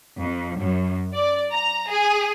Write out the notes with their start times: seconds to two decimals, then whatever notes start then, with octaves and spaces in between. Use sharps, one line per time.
0.19 F2
0.59 F#2
1.15 D5
1.52 A#5
1.90 G#4